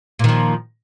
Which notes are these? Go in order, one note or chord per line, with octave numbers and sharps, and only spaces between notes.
A#2 D#3 F3